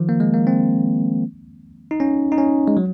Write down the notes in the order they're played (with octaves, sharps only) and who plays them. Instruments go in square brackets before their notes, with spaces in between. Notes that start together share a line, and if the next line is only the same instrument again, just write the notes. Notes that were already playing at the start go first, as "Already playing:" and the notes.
Already playing: [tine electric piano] D#3 F3
A#3
G#3
A#3
C4
D#4
C#4
D#4
C#4
G#3
F#3